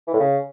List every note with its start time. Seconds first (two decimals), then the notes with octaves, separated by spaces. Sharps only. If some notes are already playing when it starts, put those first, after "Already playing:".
0.08 E3
0.14 A2
0.20 C#3